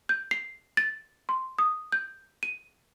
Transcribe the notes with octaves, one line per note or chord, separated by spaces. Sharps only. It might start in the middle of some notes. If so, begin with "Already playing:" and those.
G6
C7
A6
C6
D#6
G6
D#7